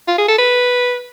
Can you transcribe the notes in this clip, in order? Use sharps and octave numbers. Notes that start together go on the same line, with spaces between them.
F4
G#4
A4
B4